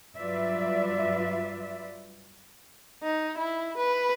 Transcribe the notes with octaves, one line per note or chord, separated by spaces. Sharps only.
G2 F#3 F4 B4 D5 E5
D#4
E4
B4